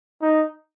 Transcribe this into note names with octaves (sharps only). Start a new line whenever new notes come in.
D#4